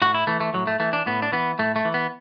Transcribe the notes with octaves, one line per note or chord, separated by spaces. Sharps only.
A2 F#4
E4
E3 A3
A3
A2 F#3
A3
E3 A3
D4
A2 B3
D4
E3 B3
A2 A3
A3
E3
B3